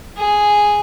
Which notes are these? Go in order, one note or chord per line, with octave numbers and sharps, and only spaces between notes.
G#4